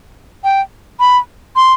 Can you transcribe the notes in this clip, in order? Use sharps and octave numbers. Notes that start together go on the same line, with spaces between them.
G5
B5
C6